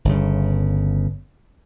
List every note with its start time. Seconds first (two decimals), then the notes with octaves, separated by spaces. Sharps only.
0.05 G1 C#3